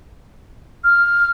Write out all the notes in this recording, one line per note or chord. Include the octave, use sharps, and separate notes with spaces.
F6